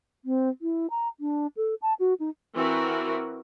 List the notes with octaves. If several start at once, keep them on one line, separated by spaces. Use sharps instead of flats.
C4
E4
A#5
D4
A4
A5
F#4
D#4
E3 C4 F#4 A#4 B4